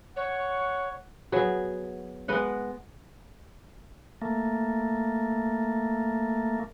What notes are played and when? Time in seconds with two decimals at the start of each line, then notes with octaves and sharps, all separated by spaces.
0.16 C#5 F#5
1.32 F#3 B3 G#4
2.28 G#3 B3 D#5 F#5
4.22 A3 A#3